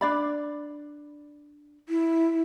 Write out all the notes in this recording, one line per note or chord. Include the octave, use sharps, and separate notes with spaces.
D4 D5 B5
E4